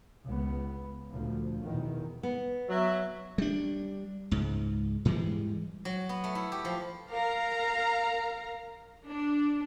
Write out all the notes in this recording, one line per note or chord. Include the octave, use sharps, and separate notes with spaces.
C#2 B3
D2 A#2 F3
E2 B2 D#3
B3
F#3 E5
G3 D4
C#2 G#2
G#2 E3 G3 G#3
F#3
B3
A3
E4
G4
F3
A#4 F5 A#5
D4